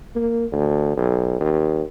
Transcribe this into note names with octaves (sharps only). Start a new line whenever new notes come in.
A#3
D2
B1
D#2